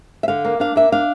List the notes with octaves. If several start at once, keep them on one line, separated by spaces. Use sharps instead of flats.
E5
D3 F5
A#3
D4 F5
A#3 E5
D4 F5